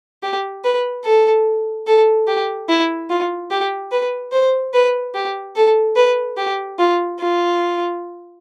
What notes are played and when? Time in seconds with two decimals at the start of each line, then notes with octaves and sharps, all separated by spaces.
0.23 G4
0.64 B4
1.04 A4
1.87 A4
2.27 G4
2.69 E4
3.10 F4
3.51 G4
3.92 B4
4.32 C5
4.74 B4
5.15 G4
5.56 A4
5.96 B4
6.37 G4
6.79 F4
7.20 F4